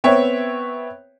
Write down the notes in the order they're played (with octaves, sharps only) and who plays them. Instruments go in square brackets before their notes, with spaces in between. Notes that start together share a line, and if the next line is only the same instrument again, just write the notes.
[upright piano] B3 C4 C#5 E5 G5